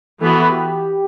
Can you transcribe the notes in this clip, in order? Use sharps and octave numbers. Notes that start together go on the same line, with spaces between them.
E3 B3 F#4 A4
G4